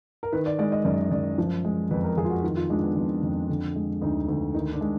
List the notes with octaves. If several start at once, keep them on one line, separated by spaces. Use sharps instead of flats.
A#4
D#3 B4
D5
G#3 D5
D#5
F#2 D5
F#2 D5
F3
G#3
F2 B4
A#4
F2 G#4
F4
F#4
D#3 F4
F4
G#3 D4
B3
F2 B3
F2
D3
G#3
D2 D#4
D2
D#3 D#4
D4
G#3